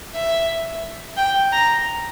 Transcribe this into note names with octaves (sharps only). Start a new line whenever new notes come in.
E5
G5
A#5